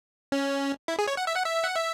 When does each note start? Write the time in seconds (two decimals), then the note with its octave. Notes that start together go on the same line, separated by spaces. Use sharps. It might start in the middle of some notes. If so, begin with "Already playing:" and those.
0.32 C#4
0.88 E4
0.99 G#4
1.07 C#5
1.17 F#5
1.27 E5
1.36 F#5
1.46 E5
1.64 F#5
1.75 E5